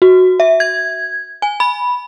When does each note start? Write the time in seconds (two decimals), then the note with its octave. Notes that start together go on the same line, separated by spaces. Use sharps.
0.02 F#4
0.40 E5
0.60 G#6
1.42 G#5
1.60 B5